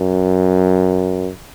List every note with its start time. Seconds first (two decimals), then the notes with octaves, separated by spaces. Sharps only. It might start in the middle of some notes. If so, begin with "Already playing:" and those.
Already playing: F#2